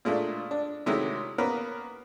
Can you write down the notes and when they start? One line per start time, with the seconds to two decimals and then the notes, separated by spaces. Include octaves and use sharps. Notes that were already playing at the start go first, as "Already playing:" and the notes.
0.05 A#2 G#3 A3 D4
0.51 D4
0.86 C3 D#3 F#3 G#3 A3 E4
1.38 A#3 B3 C#4 A#4 B4